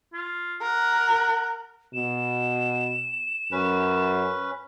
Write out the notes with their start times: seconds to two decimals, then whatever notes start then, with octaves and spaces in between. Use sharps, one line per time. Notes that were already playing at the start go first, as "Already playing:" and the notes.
0.13 F4
0.62 A#4 F#5
1.94 B2 E7
3.52 F#2 C#4 B4